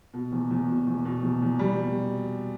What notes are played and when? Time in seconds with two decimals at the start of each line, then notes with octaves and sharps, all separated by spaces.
0.13 B2
0.32 E2
0.51 E2
0.69 B2
0.87 E2
1.05 B2
1.23 E2
1.42 E2
1.59 E2 G3
1.78 B2